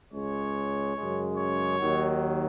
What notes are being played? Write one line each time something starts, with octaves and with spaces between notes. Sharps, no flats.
C#2 C#3 G#3 C#5
F#2 C#3 G#3
C#5
D#2 D#3 F#3